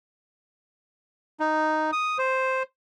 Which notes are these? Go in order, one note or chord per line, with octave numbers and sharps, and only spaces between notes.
D#4
D#6
C5